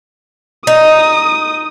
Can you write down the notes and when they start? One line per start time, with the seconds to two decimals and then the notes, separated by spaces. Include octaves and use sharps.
0.67 D#4 D#6